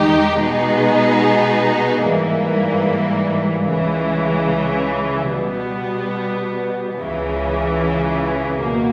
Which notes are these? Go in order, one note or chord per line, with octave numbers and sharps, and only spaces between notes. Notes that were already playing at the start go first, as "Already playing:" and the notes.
Already playing: E2 D#3 G#3 D#4 G4
B2 G#3 B3 D#4 G#4
G#2 E3 G3 A#3
C#2 C#3 E3
B2 G3 B3
C#2 C#3 E3
B2 A#3